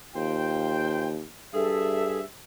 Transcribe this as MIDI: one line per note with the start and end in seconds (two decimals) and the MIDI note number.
0.16 1.21 39
0.16 1.11 65
0.16 1.11 72
0.16 1.11 79
1.54 2.21 43
1.54 2.22 68
1.54 2.18 69
1.54 2.22 76